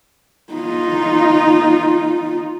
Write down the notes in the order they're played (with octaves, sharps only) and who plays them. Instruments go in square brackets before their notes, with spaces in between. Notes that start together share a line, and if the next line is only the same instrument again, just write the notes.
[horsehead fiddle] D#4 F4